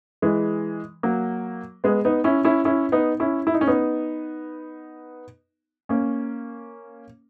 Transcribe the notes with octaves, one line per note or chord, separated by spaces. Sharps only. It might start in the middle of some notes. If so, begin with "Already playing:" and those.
E3 G#3
F#3 A#3
G#3 B3
B3 D#4
C#4 E4
C#4 E4
C#4 E4
B3 D#4
C#4 E4
E4
D#4
C#4
B3 D#4
A#3 C#4